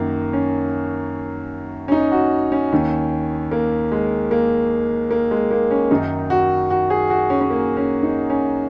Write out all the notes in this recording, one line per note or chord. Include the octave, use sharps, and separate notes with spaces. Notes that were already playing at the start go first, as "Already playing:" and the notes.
Already playing: F#2 D#3 A#3
C#4
C#4
D#4
F#4
C#4
D#2 D#3
A#3
G#3
A#3
A#3
G#3
A#3
C#4
F#2 D#3 D#4
F#4
F#4
G#4
F#4
C#4
C#4
A#3
C#4
D#4
C#4